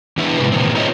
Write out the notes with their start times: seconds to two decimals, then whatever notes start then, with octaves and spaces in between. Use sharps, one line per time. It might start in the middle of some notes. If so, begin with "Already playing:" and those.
0.17 E3 B3 D4 E4 B4 E5
0.38 G#2 C3 B4
0.52 A#2 D#3 E3 C4
0.75 D#4 F4 B4 C#5 D#5 E5